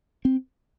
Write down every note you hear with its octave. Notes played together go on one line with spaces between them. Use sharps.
C4